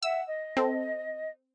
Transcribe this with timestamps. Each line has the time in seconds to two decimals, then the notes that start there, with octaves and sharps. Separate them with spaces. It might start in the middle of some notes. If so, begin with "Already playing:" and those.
0.03 E5 F#5 E6
0.27 D#5
0.57 C4 A4